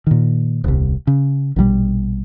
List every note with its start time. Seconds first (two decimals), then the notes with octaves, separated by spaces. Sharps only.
0.07 A#2 D#3
0.64 D#1 C2
1.07 C#3
1.56 A#1 B2 D3 G3